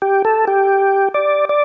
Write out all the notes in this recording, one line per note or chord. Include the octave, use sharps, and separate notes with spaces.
G4
A4
G4
D5
D5